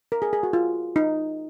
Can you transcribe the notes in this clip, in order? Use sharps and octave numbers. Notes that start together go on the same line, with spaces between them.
A#4
G#4
G#4
F#4
F4
D#4